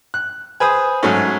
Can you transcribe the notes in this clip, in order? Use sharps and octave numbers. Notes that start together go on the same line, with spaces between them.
F#6
G#4 B4 C5 D#6
G#2 F#3 A3 C#4